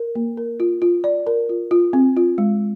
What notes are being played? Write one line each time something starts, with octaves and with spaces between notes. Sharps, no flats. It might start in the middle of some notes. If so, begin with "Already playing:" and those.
Already playing: A#4
A#3
A#4
F4
F4
D5
A#4
F4
F4
C4
F4
G#3